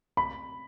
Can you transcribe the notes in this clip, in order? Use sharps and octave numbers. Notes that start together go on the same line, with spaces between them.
B5